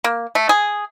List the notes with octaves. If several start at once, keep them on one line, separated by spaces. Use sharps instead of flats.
A#3
A3
G#4